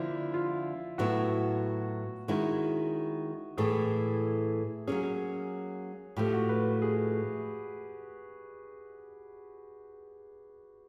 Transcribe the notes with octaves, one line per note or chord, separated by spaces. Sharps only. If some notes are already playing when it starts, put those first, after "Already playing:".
Already playing: D3 F3 A#3 E4
F4
A2 F#3 B3 E4 F#4
D#3 G#3 C#4 E4 F#4
A2 E3 A3 G#4
F#3 A#3 C#4 G#4
A2 F3 A3 G4
F#4
B4
G#4